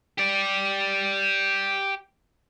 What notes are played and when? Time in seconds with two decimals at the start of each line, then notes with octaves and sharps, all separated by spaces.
0.18 G4 D5